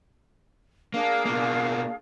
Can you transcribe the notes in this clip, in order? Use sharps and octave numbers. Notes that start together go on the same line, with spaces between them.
A#3 D4 G#4 F5
B2 A#3